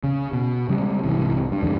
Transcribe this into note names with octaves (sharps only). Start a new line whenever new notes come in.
C#3
B2
C#3 G3 G#3
C2 G#2 C3 E3
G2
F2 G#2 D3 D#3